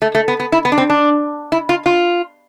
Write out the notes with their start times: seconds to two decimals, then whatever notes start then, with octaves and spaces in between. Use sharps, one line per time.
0.02 A3
0.15 A3
0.28 B3
0.40 B3
0.52 E4
0.65 B3
0.72 D4
0.78 C4
0.90 D4
1.52 E4
1.69 F4
1.86 F4